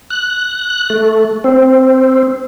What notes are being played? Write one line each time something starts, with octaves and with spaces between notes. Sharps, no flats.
F#6
A3
C4